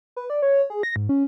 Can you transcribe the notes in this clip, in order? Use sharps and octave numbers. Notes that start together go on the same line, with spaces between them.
B4
D5
C#5
G#4
A#6
G#2
C#4